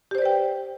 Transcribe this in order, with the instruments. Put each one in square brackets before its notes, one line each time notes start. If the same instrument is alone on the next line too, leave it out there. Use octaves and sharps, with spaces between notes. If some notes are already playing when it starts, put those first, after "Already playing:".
[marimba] G4
C5
D5
B4
G5